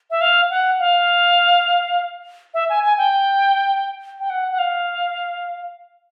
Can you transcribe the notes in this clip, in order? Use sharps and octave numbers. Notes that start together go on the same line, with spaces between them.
E5
F5
F#5
F5
E5
G#5
G#5
G5
G5
F#5
F#5
F5